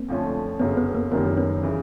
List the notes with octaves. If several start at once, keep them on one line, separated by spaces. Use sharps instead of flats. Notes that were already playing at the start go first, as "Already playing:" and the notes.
Already playing: A#3 C4
F2 D3 F3 A3 C#4
G1 F#2 C#3 F#3 B3 C#4
B3
A#3
F#1 F#2 D#3 G3 A#3 C4
B3 C#4
C#3 E3